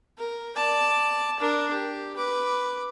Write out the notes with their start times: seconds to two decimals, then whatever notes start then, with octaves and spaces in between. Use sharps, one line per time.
0.18 A#4
0.56 D5 A5
1.40 D4 A#4
1.73 G4
2.17 B4 D6